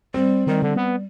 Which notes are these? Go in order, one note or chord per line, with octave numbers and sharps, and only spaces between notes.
G3 C4
D#3 G3
D3
B3